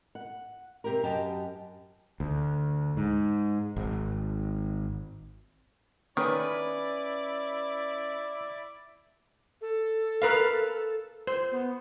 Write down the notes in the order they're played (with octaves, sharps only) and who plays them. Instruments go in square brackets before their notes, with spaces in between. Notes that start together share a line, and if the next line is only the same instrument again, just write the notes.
[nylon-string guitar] F#5
C3 G4 A#4
F#2 G4 D#5 G5 A5
[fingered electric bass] D2
G#2
G#1
[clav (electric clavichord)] D#3 [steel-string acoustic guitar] C#4 B4 [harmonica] E4 D5
[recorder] A4
[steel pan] A#4 B4 F5
C5
[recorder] B3